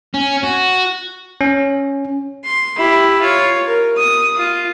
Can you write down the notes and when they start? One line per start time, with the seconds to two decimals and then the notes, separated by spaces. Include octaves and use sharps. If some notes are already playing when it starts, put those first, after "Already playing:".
0.14 C#4
0.44 F#4
1.41 C#4
2.45 C6
2.77 E4 G4
3.22 F4 C#5
3.67 A#4
3.97 D#6
4.37 F4